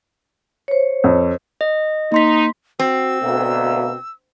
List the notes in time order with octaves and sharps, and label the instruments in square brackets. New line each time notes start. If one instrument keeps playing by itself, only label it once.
[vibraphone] C5 C#5
[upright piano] F2
[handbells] D#5
[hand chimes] A#3 C6 B6 [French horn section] D#4
[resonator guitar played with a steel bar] C4 [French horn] F#4 [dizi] E6
[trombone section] D2 A#3 [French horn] B2